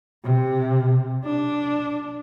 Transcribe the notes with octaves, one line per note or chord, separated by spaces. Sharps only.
C3
D4